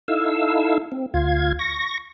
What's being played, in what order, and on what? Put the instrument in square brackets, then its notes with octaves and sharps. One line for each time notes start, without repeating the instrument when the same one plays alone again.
[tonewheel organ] D#4 E4 A4 F5 E6
C4
D2 F4 F5 G#6
C#6 A#6